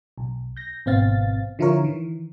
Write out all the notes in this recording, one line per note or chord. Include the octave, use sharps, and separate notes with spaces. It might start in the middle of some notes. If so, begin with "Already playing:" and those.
B1
G6 A#6
G#1 B2 B3 C4 F5 A6
D3 F3 E4 F4 A#4 C#5
D#3 E3